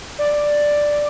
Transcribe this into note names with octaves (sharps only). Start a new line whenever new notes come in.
D5